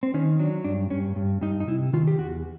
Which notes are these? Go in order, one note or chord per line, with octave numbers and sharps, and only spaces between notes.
C4
D#3 C#4
F#3 D4
G2 D4
G2 C#4
G2
G2 D#4
D#4
C3 E4
D#3 F4
G4
E2 F#4